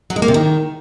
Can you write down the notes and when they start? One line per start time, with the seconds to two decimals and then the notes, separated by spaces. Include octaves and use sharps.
0.10 F#3
0.16 G#3
0.22 A#3
0.28 C3
0.34 D#3